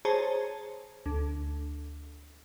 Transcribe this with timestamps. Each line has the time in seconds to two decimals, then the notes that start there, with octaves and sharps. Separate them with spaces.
0.05 G#4 C5 C#5 A5 A#5
1.06 D2